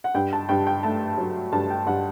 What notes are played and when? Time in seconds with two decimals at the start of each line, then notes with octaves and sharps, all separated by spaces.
0.04 F#5
0.14 G2 G5
0.33 A5
0.49 G2 G5
0.67 G5
0.83 A3 A5
1.18 F#3
1.52 G2 A5
1.70 G5
1.86 G2 F#5